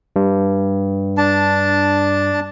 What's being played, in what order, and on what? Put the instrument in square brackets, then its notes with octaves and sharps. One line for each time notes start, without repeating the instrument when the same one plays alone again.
[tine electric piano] G2
[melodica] D4 A5